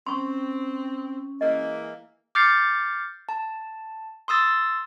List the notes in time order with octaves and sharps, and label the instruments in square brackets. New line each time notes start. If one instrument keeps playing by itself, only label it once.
[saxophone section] C4 [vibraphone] C#4 [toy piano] C6 C#6
[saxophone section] E3 G#3 A#3 [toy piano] D#5
[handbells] D6 F6 G6 A6 C7 C#7
A5
C6 D#6 E6 A6